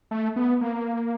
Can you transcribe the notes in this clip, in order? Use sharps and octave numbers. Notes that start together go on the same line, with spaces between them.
A3
B3
A#3